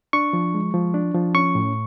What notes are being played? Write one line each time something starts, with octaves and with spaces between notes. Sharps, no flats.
D4 C#6
F3
G#3
F3
D4
F3
C#4 C#6
A2